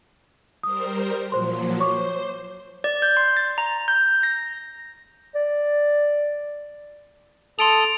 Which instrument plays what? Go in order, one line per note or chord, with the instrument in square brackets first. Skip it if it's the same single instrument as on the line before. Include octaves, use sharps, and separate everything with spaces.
[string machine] G3 A#4 C5 [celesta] D#6
[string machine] A#2 F3 F#3 [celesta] C5 C6
[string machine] C5 [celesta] C#5 C#6 D6
[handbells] D5
G6
C6
A6
A#5
G6
A#6
[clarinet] D5
[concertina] A4 D#6 [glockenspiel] C6 D7 F7